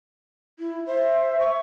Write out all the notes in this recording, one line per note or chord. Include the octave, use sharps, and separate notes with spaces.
E4
C5 E5
C#6